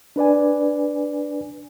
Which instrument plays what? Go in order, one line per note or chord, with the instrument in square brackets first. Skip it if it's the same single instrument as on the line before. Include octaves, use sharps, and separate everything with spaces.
[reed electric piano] D4 B4 D5 G#5